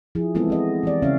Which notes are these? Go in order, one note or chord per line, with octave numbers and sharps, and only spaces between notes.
F3 E4 G#4
E3 G#3 B3 C4 E4 A4
F3 C4 D#5
E3 G4 D5
C#3 C4 C#4 C#5 E5 F5